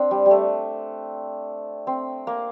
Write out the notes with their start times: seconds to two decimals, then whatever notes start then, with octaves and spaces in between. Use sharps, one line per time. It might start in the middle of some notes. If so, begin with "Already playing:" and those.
Already playing: C4 D4
0.11 G3
0.26 G3
0.31 A3
1.87 C4
2.27 A#3